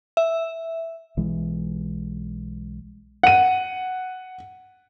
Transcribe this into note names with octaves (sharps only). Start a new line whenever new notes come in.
E5
B1 E3 G#3
F#5 D#7